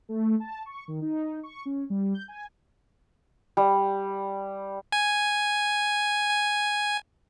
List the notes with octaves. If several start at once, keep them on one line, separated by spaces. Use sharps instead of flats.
A3
A5
C#6
D#3
D#4
C#6
C#4
G3
G6
G#5
G3
G#5
G#5